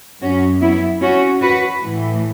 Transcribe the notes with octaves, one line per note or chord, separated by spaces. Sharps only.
F#2 F#3 C#4 F#4
B3 E4
C#4 F#4
F#4 B4
A2 E3